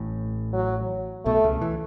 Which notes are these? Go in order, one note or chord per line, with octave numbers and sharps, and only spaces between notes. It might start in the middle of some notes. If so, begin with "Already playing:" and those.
Already playing: A1 A2
F#3
B1 B2 A3
C#2 C#3
E3